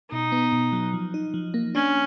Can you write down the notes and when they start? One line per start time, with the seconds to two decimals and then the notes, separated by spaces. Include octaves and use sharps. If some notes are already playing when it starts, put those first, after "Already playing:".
0.11 B2 D#4
0.32 B3
0.52 B2
0.72 F#3
0.93 F3
1.14 D#4
1.34 F3
1.54 A#3
1.75 C#4 D4